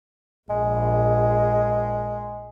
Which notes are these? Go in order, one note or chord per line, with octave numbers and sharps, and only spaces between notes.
A#1 G#3